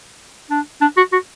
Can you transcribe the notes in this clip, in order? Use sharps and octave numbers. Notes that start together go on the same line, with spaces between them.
D4
D4
F#4
F#4